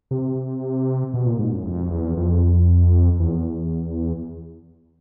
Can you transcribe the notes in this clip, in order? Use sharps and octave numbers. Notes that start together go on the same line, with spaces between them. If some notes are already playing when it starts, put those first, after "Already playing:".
C3
B2
A#2
G#2
F#2
F2
E2
F2
E2